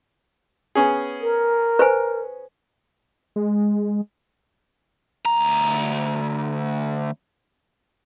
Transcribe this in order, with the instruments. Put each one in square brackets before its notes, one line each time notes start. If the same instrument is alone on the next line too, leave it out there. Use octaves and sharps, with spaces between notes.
[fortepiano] B3 C#4 G#4
[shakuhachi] A#4
[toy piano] B4 C5 G#5
[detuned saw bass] G#3
[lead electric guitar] D2 A#5